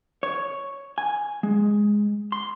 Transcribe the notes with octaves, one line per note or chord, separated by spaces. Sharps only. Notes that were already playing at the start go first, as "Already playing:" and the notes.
C#5
G#5
G#3
C6